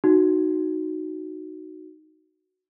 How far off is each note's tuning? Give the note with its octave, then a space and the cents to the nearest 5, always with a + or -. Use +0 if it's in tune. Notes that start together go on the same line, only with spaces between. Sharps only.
D#4 +0 F#4 +0